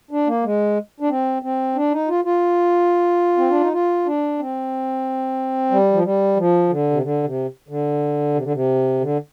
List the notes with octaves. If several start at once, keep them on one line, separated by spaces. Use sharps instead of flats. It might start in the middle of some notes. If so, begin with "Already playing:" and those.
D4
A#3
G#3
D4
C4
C4
D4
D#4
F4
F4
C4
D4
D#4
F4
D4
C4
G3
F3
G3
F3
D3
C3
D3
C3
D3
C3
D3
C3
D3